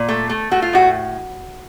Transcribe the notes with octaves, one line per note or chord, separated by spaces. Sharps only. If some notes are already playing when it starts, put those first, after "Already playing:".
Already playing: A#2
A3
A3
A3 F#4
F4
A2 F#4